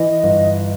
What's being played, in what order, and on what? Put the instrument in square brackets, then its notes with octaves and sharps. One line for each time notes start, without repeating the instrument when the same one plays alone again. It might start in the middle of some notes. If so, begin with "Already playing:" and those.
Already playing: [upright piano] E3 [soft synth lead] D#5
[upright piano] G1